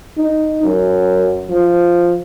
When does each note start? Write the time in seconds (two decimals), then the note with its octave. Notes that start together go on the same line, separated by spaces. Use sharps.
0.17 D#4
0.63 F#2
1.49 F3